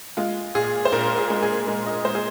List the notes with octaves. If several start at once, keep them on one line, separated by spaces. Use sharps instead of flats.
G#3 F4
A#2 G#4
C5
A#2 A#4
G#4
G#3
G#4
G#3 A#4
D#5
G#3 C5
G#4